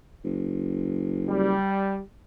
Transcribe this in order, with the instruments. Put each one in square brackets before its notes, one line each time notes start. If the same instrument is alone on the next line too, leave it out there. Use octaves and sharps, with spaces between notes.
[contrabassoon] F#1
[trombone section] G3